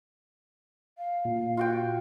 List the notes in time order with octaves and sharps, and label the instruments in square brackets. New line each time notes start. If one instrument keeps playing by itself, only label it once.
[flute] F5
[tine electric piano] A#2
[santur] F4 F#4 G5